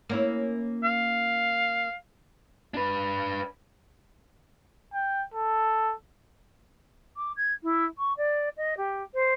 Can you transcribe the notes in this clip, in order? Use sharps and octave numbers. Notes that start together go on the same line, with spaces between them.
A#3 C#4 E4
F5
D4 B4
G5
A4
D6
G#6
E4
C#6
D5
D#5
G4
C5